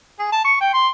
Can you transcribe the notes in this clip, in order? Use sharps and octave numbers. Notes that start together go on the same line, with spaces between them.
G#4
A5
C#6
G5
C6